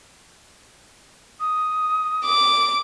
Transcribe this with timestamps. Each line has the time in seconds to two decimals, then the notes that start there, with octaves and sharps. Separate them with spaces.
1.40 D#6
2.25 D6